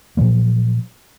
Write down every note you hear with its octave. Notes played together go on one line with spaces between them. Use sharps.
A#2 F3 F#3 A#3